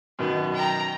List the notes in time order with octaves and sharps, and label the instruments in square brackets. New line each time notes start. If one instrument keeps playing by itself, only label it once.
[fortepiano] F#2 B2 D#3 [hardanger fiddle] B3
[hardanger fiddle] G5 A#5